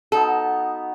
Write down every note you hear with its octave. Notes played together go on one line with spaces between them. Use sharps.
B3 D#4 F#4 A4